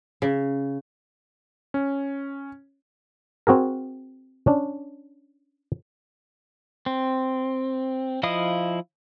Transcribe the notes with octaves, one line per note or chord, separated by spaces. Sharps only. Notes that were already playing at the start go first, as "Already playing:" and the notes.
C#3
C#4
C4 F#4 G#4 A#4
C#4 D4
C4
F3 E4 D#5 F5 D#6